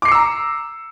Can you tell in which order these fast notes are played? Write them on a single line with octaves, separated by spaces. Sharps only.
D6 C7 C#7 E6 A#5